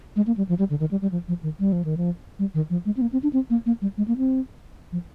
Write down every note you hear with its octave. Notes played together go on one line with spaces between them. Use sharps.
G#3
A#3
G3
F3
G3
D3
D#3
G3
G3
F3
F3
D#3
G3
F3
D#3
F3
G3
D#3
F3
G#3
C4
A#3
C4
D4
C4
A#3
A#3
G3
G#3
A#3
C4
F3